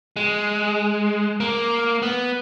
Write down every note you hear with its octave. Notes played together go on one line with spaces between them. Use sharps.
G#3
A#3
B3